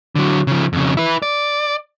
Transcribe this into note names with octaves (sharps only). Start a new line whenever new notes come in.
D3 F#3
C#3 F3
F2 C#3
E4 B4
D5